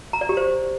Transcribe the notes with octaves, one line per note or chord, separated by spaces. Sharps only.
A#5
D5
G4
C5